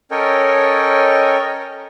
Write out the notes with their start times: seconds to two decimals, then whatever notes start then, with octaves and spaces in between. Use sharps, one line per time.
0.11 C#4 A4 A#4 C#5 D#5 G5